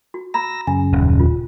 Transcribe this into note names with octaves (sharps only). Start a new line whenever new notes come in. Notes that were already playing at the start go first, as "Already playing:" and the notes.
F#4
A#5 B5 E6 A#6
F#2 C#3 G#5
D#1
F4